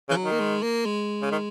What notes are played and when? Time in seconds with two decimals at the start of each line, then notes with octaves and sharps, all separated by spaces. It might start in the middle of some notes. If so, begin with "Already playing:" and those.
0.09 C#3 E3
0.17 F#3
0.24 D#3
0.32 A#3
0.40 G#3
0.63 A#3
0.85 G#3
1.22 C#3
1.32 D#3